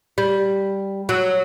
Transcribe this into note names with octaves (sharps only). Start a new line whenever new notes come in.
G3
F#3